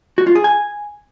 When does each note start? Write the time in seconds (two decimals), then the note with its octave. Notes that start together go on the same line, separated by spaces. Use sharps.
0.18 F#4
0.27 F4
0.35 G#4
0.44 G#5